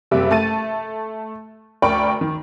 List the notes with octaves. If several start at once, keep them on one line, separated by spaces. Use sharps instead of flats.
F#1 C3 G3 E5
A3 A5 A6 D#7
D2 A#4 D5 G5 B5 C#6
D#3